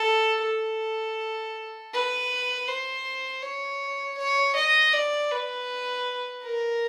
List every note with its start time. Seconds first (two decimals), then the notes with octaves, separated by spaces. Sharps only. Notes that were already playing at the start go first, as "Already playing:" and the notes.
Already playing: A4
0.43 A4
1.93 B4
2.68 C5
3.43 C#5
4.18 C#5
4.55 D#5
4.93 D5
5.31 B4
6.43 A#4